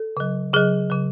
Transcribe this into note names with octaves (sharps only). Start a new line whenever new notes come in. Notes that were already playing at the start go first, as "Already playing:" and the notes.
Already playing: A4
C#3 F#3
C#3 F#3 G#4
C#3 F#3